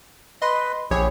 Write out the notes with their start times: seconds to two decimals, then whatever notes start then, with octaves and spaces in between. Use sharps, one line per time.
0.42 B4 D#5 C6
0.91 A#1 E4 G4 G#4 C#5